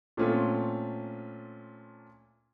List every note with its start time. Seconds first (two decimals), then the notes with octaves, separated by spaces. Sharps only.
0.17 A#2 A3 C4 C#4 F4 A4